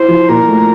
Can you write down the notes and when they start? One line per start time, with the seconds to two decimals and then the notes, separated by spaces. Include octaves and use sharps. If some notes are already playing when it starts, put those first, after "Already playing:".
Already playing: E4 C5
0.08 F3
0.29 A#2 A#4
0.48 A3